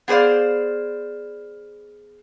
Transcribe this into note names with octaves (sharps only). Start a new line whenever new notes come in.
B3 G#4 C5 D5 F5